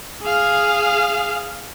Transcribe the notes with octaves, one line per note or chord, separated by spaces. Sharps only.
G#4 F5